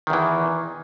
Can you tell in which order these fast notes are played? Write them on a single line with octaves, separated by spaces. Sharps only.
D#3 E2 E3